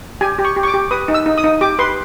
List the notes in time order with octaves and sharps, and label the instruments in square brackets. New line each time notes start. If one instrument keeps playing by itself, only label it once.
[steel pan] G4 G#5
G4
C#6
G4
C#6
D6
G4
B4 D#6
D#4
E6
D#4
D#6
D#4
G4 D6
B4 C6